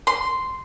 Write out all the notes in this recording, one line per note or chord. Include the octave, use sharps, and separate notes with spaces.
C6